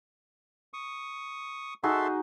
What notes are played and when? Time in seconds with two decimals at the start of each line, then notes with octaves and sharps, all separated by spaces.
0.74 C#6 D#6
1.84 D#4 F#4 G#4 A4 E5 C6